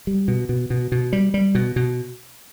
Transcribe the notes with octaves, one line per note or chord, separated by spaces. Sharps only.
G3
B2
B2
B2
B2
G3
G3
B2
B2